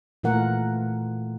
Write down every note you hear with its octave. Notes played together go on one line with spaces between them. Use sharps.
A#2 E3 A3 F4 A#4 F#5